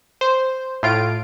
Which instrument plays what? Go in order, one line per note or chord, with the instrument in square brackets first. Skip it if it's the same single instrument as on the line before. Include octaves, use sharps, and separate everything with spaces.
[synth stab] C5
A2 F4 D7